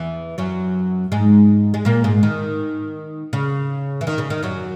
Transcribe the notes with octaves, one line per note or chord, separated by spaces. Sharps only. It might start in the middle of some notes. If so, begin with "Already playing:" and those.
Already playing: E2 E3
F#2 F#3
G#2 G#3
G#3
A#2 A#3
G#2 G#3
D#3
C#3
E3
D#3
C#3
D#3
F#2 F#3